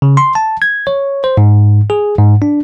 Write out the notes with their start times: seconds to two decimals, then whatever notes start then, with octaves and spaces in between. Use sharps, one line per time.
0.02 C#3
0.17 C6
0.35 A5
0.62 G#6
0.87 C#5
1.24 C5
1.37 G#2
1.90 G#4
2.19 G#2
2.42 D4